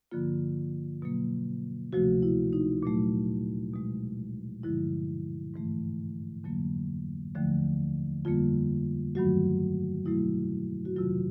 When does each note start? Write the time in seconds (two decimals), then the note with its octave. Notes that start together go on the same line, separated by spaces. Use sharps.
0.12 G2 D3 F3 A#3 F4
1.02 B2 F#3 A#3
1.93 D2 C3 F3 A3 F#4
2.23 E4
2.53 D#4
2.83 A#2 F#3 A3
3.73 B2 G#3
4.63 G2 D3 F3 G#3 E4
5.54 G#2 E3 A3
6.44 F2 D3 F#3 A#3
7.35 D#2 D3 F3 A3
8.25 F2 D3 G3 A#3 F4
9.15 G2 D#3 F#3 A3 F#4
10.06 B2 F#3 A3 E4
10.85 F#4
10.96 F2 C3 D#3 F#3 F4